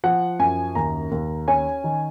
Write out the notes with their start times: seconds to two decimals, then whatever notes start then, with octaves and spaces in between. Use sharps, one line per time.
0.04 F3 F#5
0.39 F#2 G#5
0.75 D#2 A#5
1.11 D#2
1.48 C#4 G#5
1.84 D#3